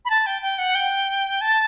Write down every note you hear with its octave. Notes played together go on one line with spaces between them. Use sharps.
B5
A5
G5
G5
F#5
G5
A5